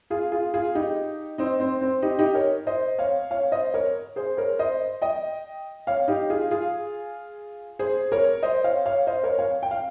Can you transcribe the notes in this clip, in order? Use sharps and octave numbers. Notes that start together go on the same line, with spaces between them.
F4 G#4
F4 G#4
F4 G#4
D#4 G4
C4 D#4
C4
C4
D#4 G4
D#4 G4
A#4 C#5
C5 D#5
C#5 F5
C#5 F5
C5 D#5
A#4 C#5
G#4 C5
A#4 C#5
C5 D#5
D#5 G5
C#5 F5
D#4 G4
F4 G#4
F4 G#4
G#4 C5
A#4 C#5
C5 D#5
C#5 F5
C#5 F5
C5 D#5
A#4 C#5
C#5 F5
G5
F5